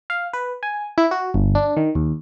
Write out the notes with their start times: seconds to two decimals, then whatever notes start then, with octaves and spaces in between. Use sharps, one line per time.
0.10 F5
0.33 B4
0.63 G#5
0.98 E4
1.11 F#4
1.34 G1
1.55 D4
1.77 D#3
1.95 D#2